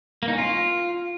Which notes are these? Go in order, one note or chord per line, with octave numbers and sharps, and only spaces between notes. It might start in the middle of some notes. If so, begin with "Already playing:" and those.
A#3
D#4
C#4
F4